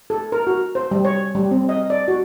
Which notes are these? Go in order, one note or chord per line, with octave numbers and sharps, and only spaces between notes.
A4
A#4
F#4
C5
G3
C#5
G3
C4
D#5
D5
F#4